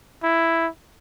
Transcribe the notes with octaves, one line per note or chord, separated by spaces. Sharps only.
E4